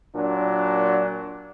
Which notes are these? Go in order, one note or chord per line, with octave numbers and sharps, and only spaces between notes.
A#2 F#3 D4